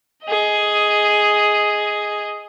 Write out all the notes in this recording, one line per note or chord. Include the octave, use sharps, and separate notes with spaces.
G#4 D#5